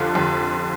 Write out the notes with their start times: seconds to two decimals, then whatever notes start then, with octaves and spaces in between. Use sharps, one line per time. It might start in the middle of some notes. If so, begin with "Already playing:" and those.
Already playing: F1 F2 D3 F4
0.15 F1 F2 D3